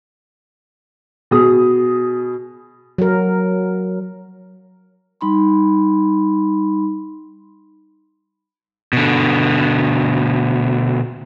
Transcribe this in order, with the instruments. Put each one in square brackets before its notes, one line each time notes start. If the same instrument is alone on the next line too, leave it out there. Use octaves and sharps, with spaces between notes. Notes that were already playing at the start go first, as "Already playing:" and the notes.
[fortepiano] B2 G#4 D#6
[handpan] F#3 A#4
[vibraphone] G3 D#4 B5 C6
[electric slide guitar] B2 D3